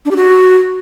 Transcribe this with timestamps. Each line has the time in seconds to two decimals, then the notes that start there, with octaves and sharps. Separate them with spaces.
0.05 D4
0.11 G4
0.16 F#4